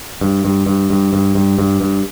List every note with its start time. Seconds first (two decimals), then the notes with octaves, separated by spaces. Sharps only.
0.21 G2
0.45 G2
0.66 G2
0.90 G2
1.13 G2
1.35 G2
1.59 G2
1.81 G2